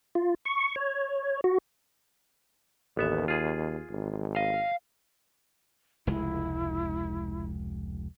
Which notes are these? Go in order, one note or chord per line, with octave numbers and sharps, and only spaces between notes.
F4
C#6
C#5
F#4
A1 D#2 B3 E5
F4 G#4
G#1
D#5 F5
F1 C#2 G#3 E4